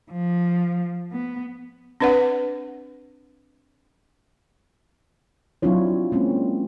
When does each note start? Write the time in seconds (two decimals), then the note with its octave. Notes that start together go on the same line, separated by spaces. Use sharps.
0.11 F3
1.12 B3
2.00 C4 D4 B4 D5 F#5
5.62 F#3 C4 D4 E4 F4 C#5
6.12 G#3 A#3 C4 C#4